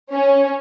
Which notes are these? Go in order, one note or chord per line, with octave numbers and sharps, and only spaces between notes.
C#4